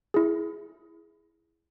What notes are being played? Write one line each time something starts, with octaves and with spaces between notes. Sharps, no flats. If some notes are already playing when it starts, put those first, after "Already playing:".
E4 G#4